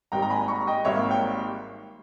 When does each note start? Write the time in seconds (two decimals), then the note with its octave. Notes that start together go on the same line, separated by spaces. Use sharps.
0.12 G#1 G#2 G3 A#3 G5 A#5
0.22 A#5
0.30 G#5 B5
0.48 A#5 C#6
0.67 D#5 G5
0.85 G#1 G#2 G3 A#3 C#5 E5
1.11 G5